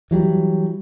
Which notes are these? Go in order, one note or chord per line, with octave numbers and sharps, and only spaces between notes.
E3 F#3 G3